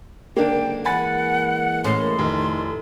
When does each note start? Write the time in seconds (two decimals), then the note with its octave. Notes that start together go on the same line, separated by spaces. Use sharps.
0.37 F#1 G#2 D3 A#3 D4 G5
0.85 E3 G#3 A#3 F#5 G#5 B5 A6
1.84 A2 C#4 C6 C7
2.19 F1 D#3